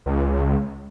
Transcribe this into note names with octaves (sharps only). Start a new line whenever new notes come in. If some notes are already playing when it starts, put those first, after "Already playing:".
C#2